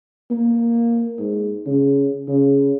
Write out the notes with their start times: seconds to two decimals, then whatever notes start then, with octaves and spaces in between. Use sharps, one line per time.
0.31 A#3
1.19 G#2
1.66 C#3
2.28 C#3